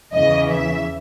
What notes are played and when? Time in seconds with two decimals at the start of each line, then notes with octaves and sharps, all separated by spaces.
0.13 E2 C#3 E3 D#5
0.50 E5